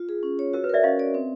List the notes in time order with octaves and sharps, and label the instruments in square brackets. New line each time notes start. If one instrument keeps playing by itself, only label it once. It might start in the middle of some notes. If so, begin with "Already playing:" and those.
Already playing: [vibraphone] F4
G#4
C#4
C#5
[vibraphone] F#4 [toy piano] A#4
[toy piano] B4
[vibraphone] A#4 [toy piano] D5 E5
[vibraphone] C#4 [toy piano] D#5 F5
[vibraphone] D5
C4